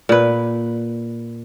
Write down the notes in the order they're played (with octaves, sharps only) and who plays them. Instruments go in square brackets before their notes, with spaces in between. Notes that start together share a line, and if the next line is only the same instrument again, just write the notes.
[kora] A#2 B4